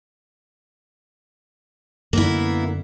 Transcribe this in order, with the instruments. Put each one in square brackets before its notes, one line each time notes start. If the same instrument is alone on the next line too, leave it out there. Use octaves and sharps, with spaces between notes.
[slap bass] F#2 D3 [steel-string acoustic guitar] A#3 B3 E4